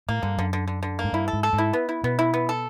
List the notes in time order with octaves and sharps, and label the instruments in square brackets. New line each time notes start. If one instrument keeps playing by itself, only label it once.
[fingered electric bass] A2 [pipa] A#3
[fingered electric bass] G2 [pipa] D3
[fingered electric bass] F#2 [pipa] D3
[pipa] D3
D3
D3
A#3
[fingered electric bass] G#2
[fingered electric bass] G2 [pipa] E4
[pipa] A4
[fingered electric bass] G#2
[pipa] A4
[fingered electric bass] G#2
[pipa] E4
B3
E4
[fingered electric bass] B2 [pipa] B3
[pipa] E4
B3
A4